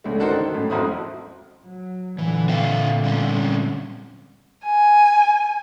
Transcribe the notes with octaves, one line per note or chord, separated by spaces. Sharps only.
C#2 D3 A3
D4 D#4 F#4 A4 A#4 C5
D#3
F#2 A2
G#1 F2 E4 F#4 C5 D#6
F#3
A#2 D3 E3
C4 E5 F5
G3 C4 C#4
G#5